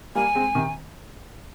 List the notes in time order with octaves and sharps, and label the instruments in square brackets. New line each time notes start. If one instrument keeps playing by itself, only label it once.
[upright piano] G3 A#3 [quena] G#5
[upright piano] G#3 C4
C3 D#3